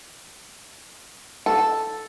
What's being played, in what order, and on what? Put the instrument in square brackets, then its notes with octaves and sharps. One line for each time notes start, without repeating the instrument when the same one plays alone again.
[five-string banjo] A4